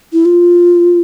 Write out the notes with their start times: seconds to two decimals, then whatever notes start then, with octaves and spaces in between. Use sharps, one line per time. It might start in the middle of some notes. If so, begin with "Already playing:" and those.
0.13 E4
0.25 F4